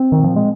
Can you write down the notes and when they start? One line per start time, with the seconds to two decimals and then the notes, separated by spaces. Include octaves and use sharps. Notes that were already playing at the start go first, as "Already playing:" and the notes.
Already playing: C4
0.12 D#3
0.19 A#2
0.24 F3
0.36 G#3